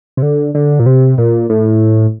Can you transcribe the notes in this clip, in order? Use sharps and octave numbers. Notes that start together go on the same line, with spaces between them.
C3
D3
D3
A#2
C3
A#2
A2